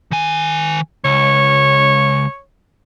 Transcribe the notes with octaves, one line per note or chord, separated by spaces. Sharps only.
D#3 G#5
C#2 C#5